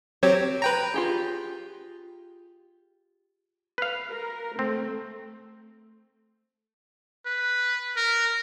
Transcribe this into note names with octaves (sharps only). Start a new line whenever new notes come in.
F#3 C4 G4 C#5
B4 G5 A#5
F4 G4 G#4
B4 F5
A#4
A3 C4
B4
A#4